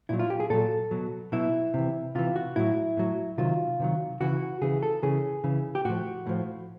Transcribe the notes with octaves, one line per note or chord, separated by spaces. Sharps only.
A#2 F#3 E4
F4
G4
G#4
A#2 F#3 A4
B2 F#3
B2 F#3 E4
C3 E3
C3 E3 F4
F#4
A2 F#3 E4
A2 F#3
C3 D#3 F#3 F4
C3 D#3 F#3
C#3 E3 F#4
C#3 E3 G#4
A4
C#3 E3 G#4
C#3 E3
G4
A2 F3 F#4
A2 F3